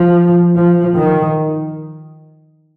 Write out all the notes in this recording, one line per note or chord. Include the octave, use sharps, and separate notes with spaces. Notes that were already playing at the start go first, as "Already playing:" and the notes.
Already playing: F3
F3
D#3